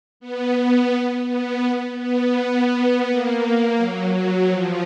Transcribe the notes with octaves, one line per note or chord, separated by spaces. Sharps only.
B3
B3
B3
B3
A#3
F#3
F#3
F3